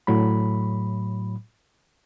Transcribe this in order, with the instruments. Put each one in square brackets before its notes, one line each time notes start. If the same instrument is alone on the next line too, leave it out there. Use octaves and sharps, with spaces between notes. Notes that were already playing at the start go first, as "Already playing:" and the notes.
[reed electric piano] A2 F#3 B5